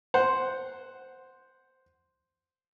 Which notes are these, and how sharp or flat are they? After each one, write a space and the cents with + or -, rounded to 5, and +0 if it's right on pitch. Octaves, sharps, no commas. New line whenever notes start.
C5 +0 F#5 +0